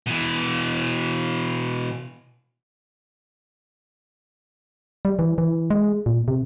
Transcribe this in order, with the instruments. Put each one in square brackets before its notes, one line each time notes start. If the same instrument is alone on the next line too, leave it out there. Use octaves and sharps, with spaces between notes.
[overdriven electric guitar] B2 E3
[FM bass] G3
E3
E3
G#3
A#2
C3